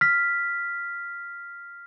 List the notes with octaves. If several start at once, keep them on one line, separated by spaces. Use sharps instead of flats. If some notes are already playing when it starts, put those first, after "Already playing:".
F6 B6